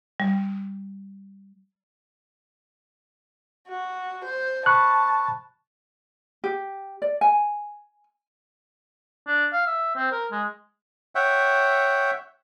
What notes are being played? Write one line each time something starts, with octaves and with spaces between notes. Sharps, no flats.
G3
F#4
C5
A5 B5 C#6 F#6
G4
D5
G#5
D4
F5
E5
C4
A#4
G#3
C#5 E5 F#5 G5